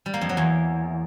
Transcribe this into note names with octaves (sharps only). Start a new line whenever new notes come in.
G3
A#3
F2
F#3
E2